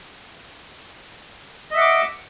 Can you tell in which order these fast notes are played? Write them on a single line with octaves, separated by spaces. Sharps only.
D#5 E5 F#5 D6